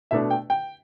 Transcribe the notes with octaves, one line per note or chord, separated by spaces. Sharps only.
B2 A3 D4 E5
G5
G5